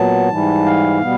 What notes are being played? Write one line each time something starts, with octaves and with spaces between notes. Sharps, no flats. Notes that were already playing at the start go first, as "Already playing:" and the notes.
Already playing: A#2 F#3 B3 A5
G#2 E3 G3
F5
B2 G3 B3